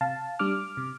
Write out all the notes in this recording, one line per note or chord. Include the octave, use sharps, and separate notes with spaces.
C3 F5 A5
G3 D4 D6 F6
C3